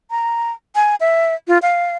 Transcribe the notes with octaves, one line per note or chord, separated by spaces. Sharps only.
A#5
G#5
E5
F4
F5